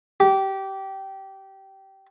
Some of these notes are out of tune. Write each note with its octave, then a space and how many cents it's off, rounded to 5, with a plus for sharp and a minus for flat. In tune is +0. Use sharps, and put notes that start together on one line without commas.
G4 -20